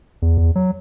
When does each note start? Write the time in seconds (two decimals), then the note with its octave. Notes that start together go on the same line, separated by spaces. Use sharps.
0.22 E2
0.37 E2
0.56 F#3